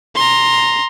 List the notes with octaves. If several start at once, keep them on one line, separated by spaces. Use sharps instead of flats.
A#5 C6